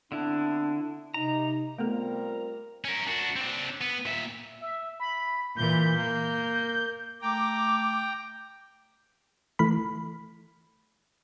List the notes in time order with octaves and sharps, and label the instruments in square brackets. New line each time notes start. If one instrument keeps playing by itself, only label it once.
[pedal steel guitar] D3 E4 [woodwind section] B3 C4 D4
[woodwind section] C3 [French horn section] D#4 [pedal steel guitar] A#5
[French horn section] G3 C4 F4 [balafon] A3 B3 A4 [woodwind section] A#4
[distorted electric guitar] C#4 A#4
D4 F#4
C4 D4
B3
A#2 E5
[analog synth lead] E5
B5
[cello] A#2 E3 [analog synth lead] G6
[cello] A#3
[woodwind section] A3 D6 [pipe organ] G5 A#5
[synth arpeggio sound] E3 A3 B5